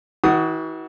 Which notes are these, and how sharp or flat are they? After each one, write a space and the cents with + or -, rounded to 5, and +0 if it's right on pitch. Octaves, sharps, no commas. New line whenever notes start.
E3 -40 F#4 +20 D#6 +0